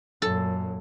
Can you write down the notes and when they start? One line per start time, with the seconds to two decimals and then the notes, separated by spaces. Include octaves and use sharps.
0.22 F#2 A#2 A4